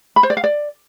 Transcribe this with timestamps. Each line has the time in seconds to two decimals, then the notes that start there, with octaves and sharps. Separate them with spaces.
0.16 B5
0.23 C5
0.30 D5
0.37 F5
0.44 D5